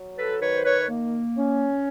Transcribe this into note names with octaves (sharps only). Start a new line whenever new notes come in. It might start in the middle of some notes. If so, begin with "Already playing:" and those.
Already playing: F#3
A4 B4
D#3 B4 C#5
C5
B4 C#5
A#3
C#4